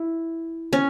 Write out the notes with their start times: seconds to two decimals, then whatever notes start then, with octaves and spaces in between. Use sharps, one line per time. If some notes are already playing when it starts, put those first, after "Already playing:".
Already playing: E4
0.73 C#4